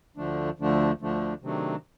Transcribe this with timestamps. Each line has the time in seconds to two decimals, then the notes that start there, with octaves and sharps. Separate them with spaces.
0.16 D2 D3 F3 A3 D4
0.59 D2 D3 F3 A3 D4
1.01 D2 D3 F3 A3 D4
1.42 C3 D#3 F#3 A3 D4